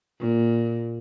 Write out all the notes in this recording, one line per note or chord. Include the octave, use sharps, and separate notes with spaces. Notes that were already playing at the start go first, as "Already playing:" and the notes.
A#2